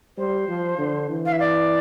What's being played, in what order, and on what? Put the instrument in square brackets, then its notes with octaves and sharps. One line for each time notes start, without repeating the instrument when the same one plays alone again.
[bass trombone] G3 [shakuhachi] C5
[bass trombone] F3
D3
E3
[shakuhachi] F5
E5
D5